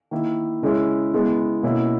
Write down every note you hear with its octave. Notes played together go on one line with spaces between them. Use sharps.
D#3 A#3 E4
C#3 G#3 C#4 E4
C#3 G#3 B3 E4
B2 A#3 C#4 E4